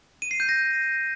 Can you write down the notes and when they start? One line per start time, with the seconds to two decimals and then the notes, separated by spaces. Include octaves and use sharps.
0.22 D#7
0.31 C7
0.40 G6
0.49 A#6